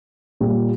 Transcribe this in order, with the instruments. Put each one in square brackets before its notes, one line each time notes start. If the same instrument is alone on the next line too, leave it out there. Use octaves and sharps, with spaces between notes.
[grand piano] A#2 G3